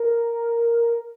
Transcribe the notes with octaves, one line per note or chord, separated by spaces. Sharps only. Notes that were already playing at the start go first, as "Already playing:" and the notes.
Already playing: A#4